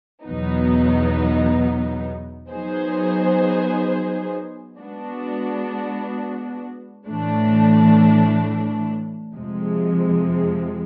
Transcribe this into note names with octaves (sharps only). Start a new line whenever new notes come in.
E2 B2 F#3 B3 D#4
F#3 B3 D#4 G#4 C5
G#3 B3 D4 F#4
A2 E3 A3 D4
F2 C3 F3 G#3